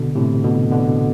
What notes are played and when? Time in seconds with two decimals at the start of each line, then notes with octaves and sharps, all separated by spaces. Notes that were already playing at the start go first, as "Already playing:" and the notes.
Already playing: B2 D3
0.15 A2 C3
0.44 B2 D3
0.72 B2 D3